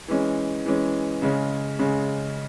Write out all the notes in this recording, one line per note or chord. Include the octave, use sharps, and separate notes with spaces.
E3 G#3 C#4
E3 G#3 C#4
C#3 G#3 C#4
C#3 G#3 C#4